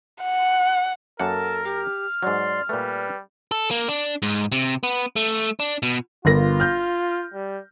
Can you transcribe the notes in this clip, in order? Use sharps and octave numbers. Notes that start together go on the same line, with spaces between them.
F#5
F#2 A#3 A4 A#4 F#5 A5
G4 F6
G#2 F#3 D5 C6
A#2 G3 A3 B4
A4
A#3
D4
G#2
C3
B3
A3
D4
B2
G1 F4 A#4 A#6
F6 G6
G3